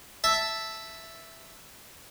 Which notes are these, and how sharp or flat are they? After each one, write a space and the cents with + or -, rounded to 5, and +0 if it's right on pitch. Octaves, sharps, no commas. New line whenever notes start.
E5 +0 A5 +0